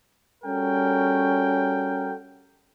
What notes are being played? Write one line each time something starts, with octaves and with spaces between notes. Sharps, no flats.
G3 C#4 F#4 A4 A#4 G5